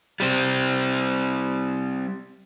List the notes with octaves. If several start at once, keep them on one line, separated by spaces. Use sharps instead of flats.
G3 C4